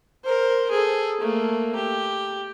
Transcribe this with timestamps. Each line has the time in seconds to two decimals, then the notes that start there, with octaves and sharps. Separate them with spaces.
0.24 A#4 C5
0.71 G#4 A4
1.21 A3 A#3
1.75 G4